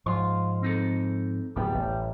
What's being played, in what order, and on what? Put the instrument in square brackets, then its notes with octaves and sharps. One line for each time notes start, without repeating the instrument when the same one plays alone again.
[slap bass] G#2 F3 [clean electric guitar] F5 C6
[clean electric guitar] C4 D#4 A4
[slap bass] D1 F#2 B3 [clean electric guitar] G3 G5
[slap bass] A1